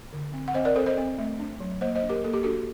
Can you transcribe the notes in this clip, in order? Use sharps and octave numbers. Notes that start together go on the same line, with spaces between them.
D3
C4
F#5
C4 C5 D#5
A#4 D5
C4 A4 C5
C5 D#5
C4
A3
D4
F#3
A#3 C5 D#5
C5 D#5
D4
G4 A#4
A#3 A4
G4
D4 F#4 A4